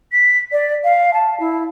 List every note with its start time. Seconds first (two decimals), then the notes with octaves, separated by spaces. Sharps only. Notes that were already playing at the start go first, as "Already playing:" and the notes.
0.12 B6
0.52 D5
0.84 F5
1.14 A5
1.40 E4